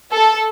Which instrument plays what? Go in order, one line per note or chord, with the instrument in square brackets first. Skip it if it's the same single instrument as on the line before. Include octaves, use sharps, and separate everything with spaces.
[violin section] A4